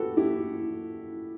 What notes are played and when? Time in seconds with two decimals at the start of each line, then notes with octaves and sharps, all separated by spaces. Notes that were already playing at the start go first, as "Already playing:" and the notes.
Already playing: F#4 G4 A4 B4
0.17 E4 G4